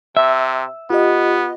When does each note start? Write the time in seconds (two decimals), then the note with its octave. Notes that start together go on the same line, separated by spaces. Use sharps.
0.17 C3 E5
0.90 B3 F4 G4 D#5